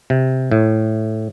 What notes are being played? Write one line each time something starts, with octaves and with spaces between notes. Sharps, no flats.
C3
A2